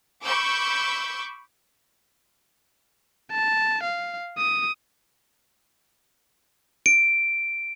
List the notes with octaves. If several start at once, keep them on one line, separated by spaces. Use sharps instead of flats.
B5 C#6 D6 E6 G6
A5
F5
D#6
D7